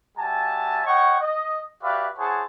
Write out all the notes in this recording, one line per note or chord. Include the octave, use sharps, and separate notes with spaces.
G3 F#4 E5 G#5 A5
C#5 D#5 F#5 G5 C#6
D#5
F#4 G4 B4 D5 E5 F5
E4 G#4 C5 C#5 F#5 A5